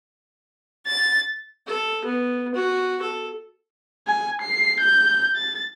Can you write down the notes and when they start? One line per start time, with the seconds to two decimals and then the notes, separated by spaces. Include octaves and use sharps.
0.86 A6
1.67 A4
2.05 B3
2.54 F#4
3.01 A4
4.07 G#5
4.42 C7
4.80 G6
5.36 A6